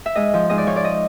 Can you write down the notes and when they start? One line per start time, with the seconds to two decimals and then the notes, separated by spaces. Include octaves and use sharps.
0.06 E5
0.15 G#2 D#5
0.34 F3
0.49 G#2 D#5
0.58 D5
0.67 F3 C#5
0.76 D5
0.84 D#5